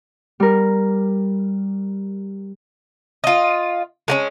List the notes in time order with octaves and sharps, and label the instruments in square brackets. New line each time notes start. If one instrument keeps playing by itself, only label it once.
[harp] G3 A#4
[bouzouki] F4 D#5
G#3 B3 C#4